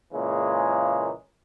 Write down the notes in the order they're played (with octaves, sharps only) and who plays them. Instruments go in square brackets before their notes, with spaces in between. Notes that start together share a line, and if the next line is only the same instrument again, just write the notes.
[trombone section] A#2 C#3 E3 G#3 A#3